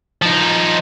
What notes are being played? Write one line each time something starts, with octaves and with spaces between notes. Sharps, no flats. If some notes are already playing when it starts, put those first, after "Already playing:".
F3 D#4